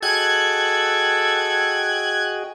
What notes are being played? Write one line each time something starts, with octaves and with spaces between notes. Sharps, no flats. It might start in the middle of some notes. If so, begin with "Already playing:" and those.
F#4 G#4 A4 D#5 G5 F#6 G#6